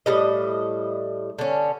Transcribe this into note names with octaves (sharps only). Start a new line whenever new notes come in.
A2 G3 D#5
D3 C#4